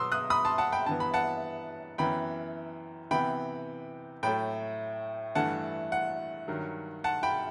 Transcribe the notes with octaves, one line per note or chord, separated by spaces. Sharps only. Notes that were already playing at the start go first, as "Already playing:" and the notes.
Already playing: B2 F#3 B3 C6 D#6 E6
D#6 F#6
B5 D#6
A5 C6
F#5 A5
G5 B5
G2 E3 B3 A5
B5
F#5 A5
F#2 E3 B3 G5 B5
C3 E3 B3 G5 B5
A2 F#3 A3 G5 B5
G2 E3 A3 F#5 A5
F#5
G2 D#3 F#3
F#5 A5
G5 B5